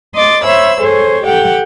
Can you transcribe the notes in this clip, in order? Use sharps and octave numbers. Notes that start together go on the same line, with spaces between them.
D#5 C6 D6 A6
C5 C#5 E5 B5 E6
G#4 A4 C5 C#5
G4 A4 F#5 G5